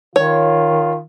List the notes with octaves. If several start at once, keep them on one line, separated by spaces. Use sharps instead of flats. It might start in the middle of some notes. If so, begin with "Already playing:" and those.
D#3 F4 C#5